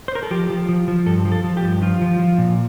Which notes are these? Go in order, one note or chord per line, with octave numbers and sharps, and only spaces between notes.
C5
A#4
A4
F3 G4
F3
F3
F3
G2 A4
F3
A4
F3
G4
G2
F3 F4
F3
F3
A#2